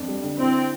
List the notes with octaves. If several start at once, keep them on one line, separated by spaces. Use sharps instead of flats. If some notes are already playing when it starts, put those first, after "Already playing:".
Already playing: F2 D4
G3
D3
C4 E4